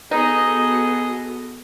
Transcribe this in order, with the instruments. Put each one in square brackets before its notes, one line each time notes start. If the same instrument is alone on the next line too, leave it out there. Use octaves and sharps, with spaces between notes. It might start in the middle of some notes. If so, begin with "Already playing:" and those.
[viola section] B3 F#4 A4 [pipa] D#4 [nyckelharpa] G#4 D#5